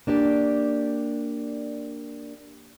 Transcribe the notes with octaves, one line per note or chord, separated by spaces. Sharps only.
A#3 D4 G4 D5